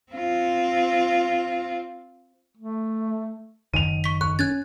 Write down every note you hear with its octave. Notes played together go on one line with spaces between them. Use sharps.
C4 F4
A3
F#1 D#3 D#7 F7
C#6 B6
C#6 F#6
C#4 F#6 G#6 A6